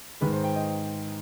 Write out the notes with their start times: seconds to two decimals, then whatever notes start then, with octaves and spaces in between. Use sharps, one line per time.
0.21 G#2 D#3 G#3 B4
0.32 C5
0.44 G5
0.55 D#5